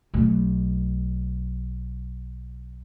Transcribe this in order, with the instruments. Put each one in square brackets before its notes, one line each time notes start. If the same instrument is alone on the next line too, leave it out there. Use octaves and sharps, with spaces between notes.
[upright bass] B1 A3